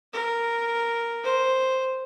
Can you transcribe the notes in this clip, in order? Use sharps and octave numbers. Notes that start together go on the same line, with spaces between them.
A#4
C5